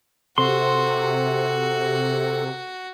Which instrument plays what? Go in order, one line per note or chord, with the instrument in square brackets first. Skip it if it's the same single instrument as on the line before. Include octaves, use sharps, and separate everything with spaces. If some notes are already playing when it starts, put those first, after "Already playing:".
[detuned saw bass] C3 [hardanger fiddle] F#4 [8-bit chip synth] A4 [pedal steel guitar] C5 C6